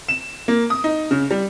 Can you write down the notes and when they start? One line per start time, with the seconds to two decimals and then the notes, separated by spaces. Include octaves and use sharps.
0.09 E7
0.48 A#3
0.70 D#6
0.84 D#4
1.11 C#3
1.31 G3